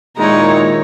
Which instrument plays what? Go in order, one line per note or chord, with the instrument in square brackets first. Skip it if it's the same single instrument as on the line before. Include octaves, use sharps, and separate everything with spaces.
[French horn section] A#2 D#3 [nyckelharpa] G#3 D#4 [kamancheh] E4 C#5 [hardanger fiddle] A#5